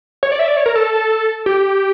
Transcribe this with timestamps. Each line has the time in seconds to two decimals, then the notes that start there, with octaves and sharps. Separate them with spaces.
0.23 C#5
0.32 D5
0.39 E5
0.48 D5
0.57 C#5
0.66 A#4
0.75 A4
1.46 G4